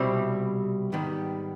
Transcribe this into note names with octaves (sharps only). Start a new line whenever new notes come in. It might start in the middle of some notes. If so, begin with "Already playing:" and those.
Already playing: C2 B2 G3 C4 E4
G#2 D#3 G3 B3